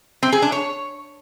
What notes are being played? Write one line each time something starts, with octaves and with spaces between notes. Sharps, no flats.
C4
G#4
D4
C#5